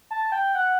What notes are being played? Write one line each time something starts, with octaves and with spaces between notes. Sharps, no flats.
A5
G5
F#5